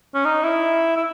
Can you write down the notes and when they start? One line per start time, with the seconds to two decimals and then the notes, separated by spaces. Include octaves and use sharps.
0.14 C#4
0.25 D#4
0.43 E4
0.96 E4